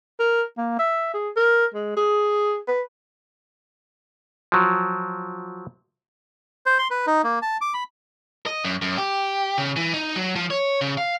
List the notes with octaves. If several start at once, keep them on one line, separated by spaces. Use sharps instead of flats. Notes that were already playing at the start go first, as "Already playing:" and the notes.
A#4
A#3
E5
G#4
A#4
G#3
G#4
B4
F3 F#3
C5
C6
B4
D#4
A#3
A5
D6
B5
D#5
F#2
F#2
G4
C#3
E3
D#4
F#3
F3
C#5
C#3
F5